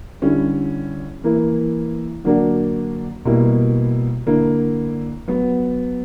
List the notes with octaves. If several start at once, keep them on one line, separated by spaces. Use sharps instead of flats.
D3 G3 C#4 E4
E3 A#3 E4
D3 F#3 A#3 D4 F#4
B2 G3 A#3 E4
D3 A#3 E4
F#3 B3 F#4